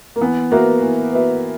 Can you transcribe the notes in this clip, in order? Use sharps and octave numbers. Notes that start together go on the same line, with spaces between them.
A#3
E3 B3
A#3 B3 F#4 B4 E5
E3
B3 F#4 B4 E5